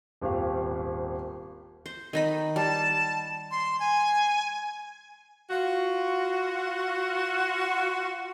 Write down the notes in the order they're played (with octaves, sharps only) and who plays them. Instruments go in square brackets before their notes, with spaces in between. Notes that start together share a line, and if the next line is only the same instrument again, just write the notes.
[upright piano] D#1 G#1 G4 F5
[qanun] C5
D#3 D#4 B5
[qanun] G3 [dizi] A5
[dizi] C6
G#5
[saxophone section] F4 F#4